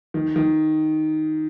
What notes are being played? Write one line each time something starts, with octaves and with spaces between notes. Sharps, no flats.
D#3
D#3